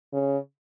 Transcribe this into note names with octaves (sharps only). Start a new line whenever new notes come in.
C#3